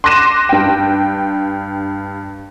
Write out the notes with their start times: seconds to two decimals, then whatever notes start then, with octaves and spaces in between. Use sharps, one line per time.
0.04 C6 D6 F#6 A#6 D#7 E7
0.49 G2 G5